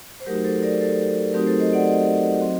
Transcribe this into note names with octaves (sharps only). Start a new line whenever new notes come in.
C5
F#3 A3 D#4 F#4 G4 A#4
A4 C5
A#4 D5
A4 C5
F#3 A3 C4 D#4 F#4 G4 A#4
A4 C5
C5 D#5
D5 F#5
C5 D#5
F#3 C4 F#4